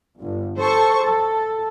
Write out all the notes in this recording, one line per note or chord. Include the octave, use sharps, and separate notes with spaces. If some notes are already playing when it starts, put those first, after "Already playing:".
G1
A4 C5 C#6
A4